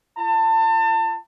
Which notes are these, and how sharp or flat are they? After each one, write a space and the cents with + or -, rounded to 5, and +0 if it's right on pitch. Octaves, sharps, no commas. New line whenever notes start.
F4 -30 A5 +30